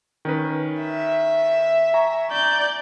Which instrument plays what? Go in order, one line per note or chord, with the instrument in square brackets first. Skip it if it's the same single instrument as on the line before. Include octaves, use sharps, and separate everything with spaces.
[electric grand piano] D#3 C#4 B4
[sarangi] E5
[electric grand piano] G#5 A#5 C#6
[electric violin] D5 G6